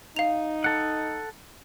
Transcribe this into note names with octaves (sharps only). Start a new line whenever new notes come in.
D#4 F5 F7
A4 F#5